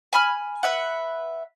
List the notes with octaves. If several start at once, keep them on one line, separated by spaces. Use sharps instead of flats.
G#5 B5 F6
B4 E5 F#5